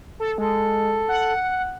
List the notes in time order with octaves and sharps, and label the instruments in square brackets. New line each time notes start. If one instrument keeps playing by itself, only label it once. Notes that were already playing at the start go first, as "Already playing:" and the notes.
[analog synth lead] A4
[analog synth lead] G#3 [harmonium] A4
[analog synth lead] F#5